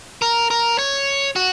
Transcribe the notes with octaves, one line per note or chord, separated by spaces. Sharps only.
A#4
A#4
C#5
F#4